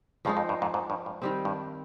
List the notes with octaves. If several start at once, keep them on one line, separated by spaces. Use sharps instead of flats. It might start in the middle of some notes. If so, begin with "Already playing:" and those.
G2 F3 G#3 D#4
F2
G2
F2 G#2
F2 G#2
G2
G2
D#3 G3 C4
G2